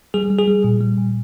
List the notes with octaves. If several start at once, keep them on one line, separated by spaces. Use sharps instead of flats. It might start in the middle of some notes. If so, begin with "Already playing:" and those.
G3 G#4
G3
G#4
G3
A#2
G3
A#2